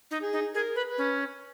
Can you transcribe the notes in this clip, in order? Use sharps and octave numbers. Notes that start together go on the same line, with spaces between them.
D#4
G#4
D#4
G#4 A#4
B4
B4
C#4